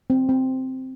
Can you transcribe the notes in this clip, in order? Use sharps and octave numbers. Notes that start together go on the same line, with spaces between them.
C4
C4